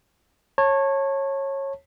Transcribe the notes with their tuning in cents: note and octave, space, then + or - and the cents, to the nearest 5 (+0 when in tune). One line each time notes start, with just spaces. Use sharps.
C#5 -20 A5 +15